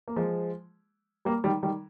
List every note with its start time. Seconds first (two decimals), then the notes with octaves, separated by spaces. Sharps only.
0.08 A#3
0.16 F3 G#3
1.25 G3 A#3
1.44 D#3 G3
1.63 D#3 G3